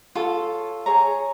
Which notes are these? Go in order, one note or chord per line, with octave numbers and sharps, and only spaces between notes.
F4 A4 C#5
G#4 C#5 A#5